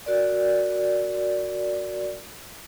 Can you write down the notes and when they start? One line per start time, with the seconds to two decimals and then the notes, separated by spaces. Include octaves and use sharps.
0.06 F#4 A#4 D5